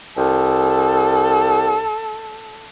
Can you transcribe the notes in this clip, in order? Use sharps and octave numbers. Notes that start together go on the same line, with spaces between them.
C2 A4